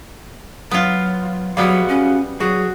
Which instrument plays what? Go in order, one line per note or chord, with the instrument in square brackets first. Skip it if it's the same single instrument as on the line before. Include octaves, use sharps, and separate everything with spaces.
[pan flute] F#3 [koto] B3 F4
[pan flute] F#3 [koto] G3 B3 [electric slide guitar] F#4 G#4 F5
[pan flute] C#4
[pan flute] F#3 [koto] F#4 [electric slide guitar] G#4